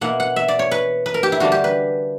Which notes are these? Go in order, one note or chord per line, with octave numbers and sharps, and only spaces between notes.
B2 A#3 E4 F#5
F#5
E5
D5
C#5
B4
B4
A#4
G4
E4
D3 G3 A#3 D4 F#4
G4
B4